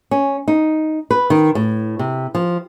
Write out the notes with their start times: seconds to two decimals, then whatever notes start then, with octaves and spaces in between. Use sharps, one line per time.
0.11 C#4
0.48 D#4
1.11 B4
1.30 D#3
1.55 A2
1.99 C3
2.35 F3